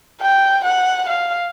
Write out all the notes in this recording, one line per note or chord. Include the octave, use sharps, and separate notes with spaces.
G5
F#5
F5